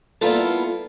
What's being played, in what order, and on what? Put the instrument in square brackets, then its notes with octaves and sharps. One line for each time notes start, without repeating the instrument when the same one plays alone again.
[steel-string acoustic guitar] G3 A#3 B3 E4 F4 A4